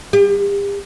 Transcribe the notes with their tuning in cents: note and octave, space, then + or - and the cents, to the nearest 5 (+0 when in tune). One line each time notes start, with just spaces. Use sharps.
G4 +40